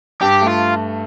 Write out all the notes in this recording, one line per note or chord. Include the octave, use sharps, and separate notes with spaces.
G2 G4
A3
F4